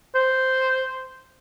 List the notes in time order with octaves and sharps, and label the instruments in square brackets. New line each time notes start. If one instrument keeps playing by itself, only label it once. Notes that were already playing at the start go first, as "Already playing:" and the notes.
[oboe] C5